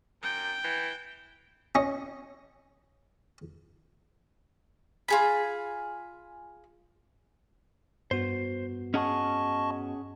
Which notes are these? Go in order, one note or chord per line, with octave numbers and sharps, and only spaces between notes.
F#2 G5
E3
C#4 D#5
F4 G#4 B5
G2 B3 F#4 C5
C#4 G#4 D#5 F#5 A5 C#6